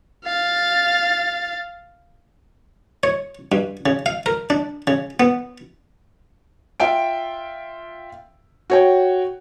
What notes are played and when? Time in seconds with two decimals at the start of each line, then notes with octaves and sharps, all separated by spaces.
0.25 F5 A6
3.03 C#5
3.52 G2
3.86 C#3
4.06 F5
4.26 A#4
4.50 D4
4.87 C#3
5.20 B3
6.80 F4 E5 G5 D7
8.70 F#4 C#5 G5